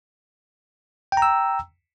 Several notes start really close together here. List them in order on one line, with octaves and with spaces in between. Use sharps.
G5 A#5 E6